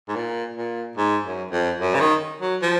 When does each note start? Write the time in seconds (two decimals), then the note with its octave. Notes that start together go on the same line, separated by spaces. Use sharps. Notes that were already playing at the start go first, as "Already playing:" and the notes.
0.08 G#2
0.16 A#2
0.56 A#2
0.97 G#2
1.24 F#2
1.52 F2
1.80 F#2
1.95 C#3
2.00 D#3
2.41 F#3
2.62 F3